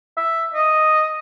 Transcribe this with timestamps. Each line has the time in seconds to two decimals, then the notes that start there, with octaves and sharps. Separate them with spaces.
0.17 E5
0.54 D#5